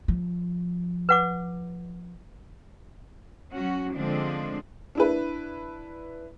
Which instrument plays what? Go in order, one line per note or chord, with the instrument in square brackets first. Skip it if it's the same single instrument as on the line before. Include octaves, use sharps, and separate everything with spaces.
[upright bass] F3
[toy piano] B4 F#5 D6
[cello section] F#3 C#4 F#4
D3 F3 G#3 C4 D4
[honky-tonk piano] D4 E4 B4